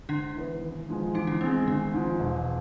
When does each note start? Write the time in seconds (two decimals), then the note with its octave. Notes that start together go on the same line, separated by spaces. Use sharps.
0.09 G#2 D3 D4
0.36 E3 B3
0.61 G#1
0.89 G#2 F3 G#3
1.15 G#2 E3 E4
1.27 D3 D4
1.41 G#3 B3 C4
1.68 G#1 D3 D4
1.93 G#2 F3
2.20 E1